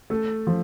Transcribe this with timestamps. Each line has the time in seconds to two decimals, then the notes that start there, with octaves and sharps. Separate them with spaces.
0.10 A3 A4
0.47 F3 F4